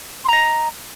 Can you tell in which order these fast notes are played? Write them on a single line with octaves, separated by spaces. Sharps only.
C6 A#5 D#5